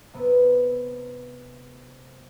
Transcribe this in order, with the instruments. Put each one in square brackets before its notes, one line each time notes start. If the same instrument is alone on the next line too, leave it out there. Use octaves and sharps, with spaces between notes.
[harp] C3 B3